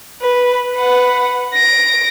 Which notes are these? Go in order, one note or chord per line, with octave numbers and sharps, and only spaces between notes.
B4
B4 F#5
A#6 D7